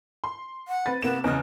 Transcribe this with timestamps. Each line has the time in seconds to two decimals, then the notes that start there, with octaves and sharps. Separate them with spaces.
0.24 C6
0.68 F#5
0.86 C4 B4 A6
1.02 C3 A#3 B3 E7
1.24 E2 C#3 D#5 F6